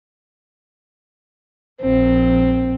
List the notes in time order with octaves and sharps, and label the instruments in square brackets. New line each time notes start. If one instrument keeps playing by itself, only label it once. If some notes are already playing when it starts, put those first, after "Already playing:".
[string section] A#1 [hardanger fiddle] C4